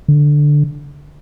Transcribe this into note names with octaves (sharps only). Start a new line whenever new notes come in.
D3